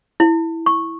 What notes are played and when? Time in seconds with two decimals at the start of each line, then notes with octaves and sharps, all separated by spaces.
0.20 E4
0.66 C#6